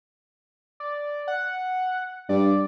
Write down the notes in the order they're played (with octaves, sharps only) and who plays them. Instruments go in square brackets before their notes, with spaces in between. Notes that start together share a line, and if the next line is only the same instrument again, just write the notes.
[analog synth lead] D5
F#5
[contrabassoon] G2 [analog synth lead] D5